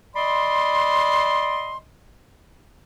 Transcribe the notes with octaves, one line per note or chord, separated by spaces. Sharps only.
D5 D#5 B5 C6